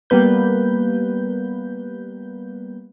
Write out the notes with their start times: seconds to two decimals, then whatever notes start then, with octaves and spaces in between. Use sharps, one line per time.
0.10 G3 A#3 B3 B4 G6